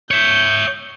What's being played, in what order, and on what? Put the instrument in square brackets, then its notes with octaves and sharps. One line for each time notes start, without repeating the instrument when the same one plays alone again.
[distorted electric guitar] C#5 E5 [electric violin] G6